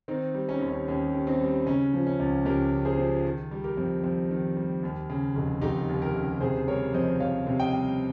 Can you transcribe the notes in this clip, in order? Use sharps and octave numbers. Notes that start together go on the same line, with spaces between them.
D#3 C4 D#4
G3
C#4
D#2 D#4
C#4
D#2 C#4
D#3
C4 D#4
G3
C#3 C#4
F3
C#4
C#2
C#2 G4 A#4
C#3
G#4 C5
F3
D#3
G3
G4 A#4
F2
F2
D#3
G3
D#2
C#3
F1
F1 D#4 G4
D#2
G4 A#4
C#3
C3 G#4 C5
G3 A#4 C#5
F2 C5 D#5
F2 C#5 F5
C3
D#5 G5
G3